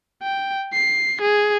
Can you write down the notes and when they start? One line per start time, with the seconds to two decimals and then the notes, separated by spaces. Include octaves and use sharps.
0.22 G5
0.73 C7
1.22 G#4